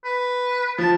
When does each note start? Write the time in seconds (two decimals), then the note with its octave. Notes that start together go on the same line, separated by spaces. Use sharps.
0.05 B4
0.78 F3 A5